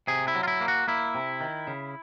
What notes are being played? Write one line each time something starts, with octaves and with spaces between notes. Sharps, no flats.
C3 G#4
E4
F#3
F4
E4
A#3
F#4
A#3 E4
C3
D#3
C#3